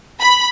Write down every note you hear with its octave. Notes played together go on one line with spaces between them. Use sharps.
B5